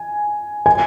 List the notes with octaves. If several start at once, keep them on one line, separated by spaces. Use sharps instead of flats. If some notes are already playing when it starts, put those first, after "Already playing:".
Already playing: G#5
G#5